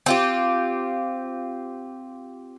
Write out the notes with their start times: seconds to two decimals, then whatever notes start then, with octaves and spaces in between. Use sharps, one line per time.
0.06 C4 F4 G4